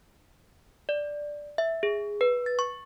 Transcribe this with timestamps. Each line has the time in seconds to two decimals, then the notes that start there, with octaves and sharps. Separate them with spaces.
0.89 D5
1.58 E5
1.83 G#4
2.21 B4
2.46 A6
2.59 C#6